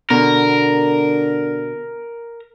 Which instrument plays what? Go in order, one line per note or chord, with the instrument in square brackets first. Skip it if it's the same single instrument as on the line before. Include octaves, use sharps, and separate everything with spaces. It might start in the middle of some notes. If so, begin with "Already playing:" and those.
[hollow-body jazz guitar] B2 [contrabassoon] D3 [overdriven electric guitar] A#4